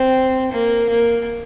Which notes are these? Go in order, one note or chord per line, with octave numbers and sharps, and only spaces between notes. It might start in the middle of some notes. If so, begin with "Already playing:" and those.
Already playing: C4
A#3
A#3